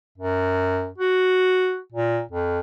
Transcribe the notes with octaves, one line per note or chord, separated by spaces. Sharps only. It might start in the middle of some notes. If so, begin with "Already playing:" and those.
F#2
F#4
A#2
F2